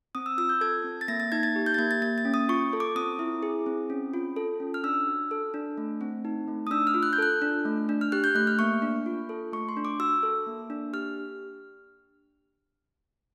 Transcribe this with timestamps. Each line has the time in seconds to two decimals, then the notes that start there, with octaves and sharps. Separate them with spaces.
0.15 C4 D#6
0.26 E6
0.38 F4 E6
0.49 G6
0.61 A4 G#6
0.84 C4
1.01 A6
1.08 A#3 A#6
1.20 A6
1.32 D#4 G#6
1.43 A6
1.56 G4
1.66 G6
1.74 A6
1.78 A#3 G#6
1.91 A6
2.02 A#3 A6
2.18 A6
2.25 C#4
2.34 D#6
2.49 F4 C#6
2.73 A4
2.80 D6
2.96 C4 D#6
3.19 E4
3.43 G#4
3.66 C4
3.90 C#4
4.14 F4
4.36 A4
4.60 C#4
4.74 F6
4.84 D4 E6
5.07 F#4
5.31 A4
5.54 D4
5.77 A3
6.01 C4
6.25 D#4
6.48 A3
6.67 D#6
6.71 D4 E6
6.87 F6
6.94 F4
7.03 F#6
7.13 G6
7.18 A4 F#6
7.42 D4
7.65 A3
7.89 D4
8.01 F6
8.12 G4 F#6
8.24 G6
8.35 A3 F#6
8.47 F6
8.59 A#3 C#6
8.82 D4
9.06 F4
9.29 A4
9.52 A3 C#6
9.69 C6
9.77 D4
9.85 D6
10.00 F#4 E6
10.23 A4
10.47 A#3
10.70 D4
10.93 G4 F6